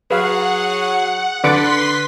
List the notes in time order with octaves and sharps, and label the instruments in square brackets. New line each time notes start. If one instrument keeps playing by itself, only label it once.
[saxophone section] F#3 G#4 [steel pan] B4 F5 [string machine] F#5
[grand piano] D3 C#7 [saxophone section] B4 [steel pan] D5 F#5 D6 [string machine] C6 B6